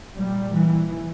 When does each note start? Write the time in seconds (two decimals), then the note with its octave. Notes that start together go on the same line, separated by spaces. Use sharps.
0.18 A#2 G3
0.55 E3